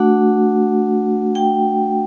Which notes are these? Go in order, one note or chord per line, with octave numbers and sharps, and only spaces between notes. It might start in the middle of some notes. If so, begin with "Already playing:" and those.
Already playing: A3 D4 F#4 F#5
G5